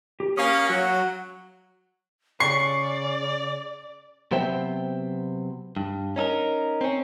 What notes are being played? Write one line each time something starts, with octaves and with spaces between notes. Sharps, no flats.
G4
A#3 C#4 F5 D#6
F#3 F#5
C#3 D5 C#6 C7
C3 F#3 B3 C5 E5 G5
G2
C#4 D#4 A4 A#4
C4 C#4